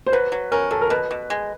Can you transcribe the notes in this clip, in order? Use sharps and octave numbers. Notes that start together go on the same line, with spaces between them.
C5
F#3 B4
F#3
C#4 A#4
F#3 A4
A#4
B2 B4
B2
G#3